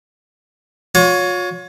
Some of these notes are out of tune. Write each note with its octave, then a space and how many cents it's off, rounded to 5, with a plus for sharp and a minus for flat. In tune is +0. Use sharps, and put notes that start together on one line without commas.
F4 +45 C#5 +15